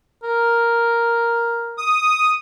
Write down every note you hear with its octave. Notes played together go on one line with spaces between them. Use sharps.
A#4
D#6